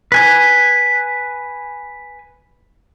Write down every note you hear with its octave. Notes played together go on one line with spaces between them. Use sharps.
B4 G#5